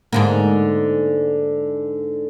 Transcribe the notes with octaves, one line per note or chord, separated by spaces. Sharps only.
G#2 D3 A#3